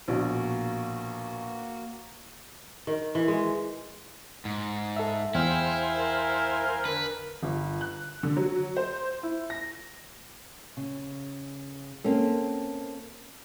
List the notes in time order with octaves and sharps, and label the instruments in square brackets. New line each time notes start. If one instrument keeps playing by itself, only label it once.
[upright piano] A#1 B2 [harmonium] A#3 F#4
[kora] D#3
E3
G#3
[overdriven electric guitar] G#2
[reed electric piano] A4 E5
[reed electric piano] E2 G5 F6 [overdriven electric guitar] E4 [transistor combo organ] C5 F5 G#5
[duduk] A#4
[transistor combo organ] D3 [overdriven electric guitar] B4
[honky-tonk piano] G1
F#6
D3
F#3
C5
E4
A#6
[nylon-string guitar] C#3
A#3 C4 C#4 A4